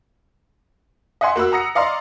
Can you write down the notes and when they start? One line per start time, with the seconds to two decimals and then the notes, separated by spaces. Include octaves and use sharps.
1.21 D#5 E5 F#5 G#5 C6
1.36 A#3 F#4 B5 E6
1.52 F#5 A#5 D#6 A#6 C#7
1.75 D5 D#5 F5 A#5 C6